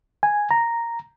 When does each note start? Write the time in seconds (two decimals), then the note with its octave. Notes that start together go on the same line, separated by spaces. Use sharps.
0.23 G#5
0.51 A#5